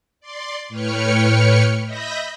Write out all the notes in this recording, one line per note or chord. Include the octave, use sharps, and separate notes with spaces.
D5 C6
A2 B4 C#5 G5 F6 C#7
D#5 E5 B5 G6 A#6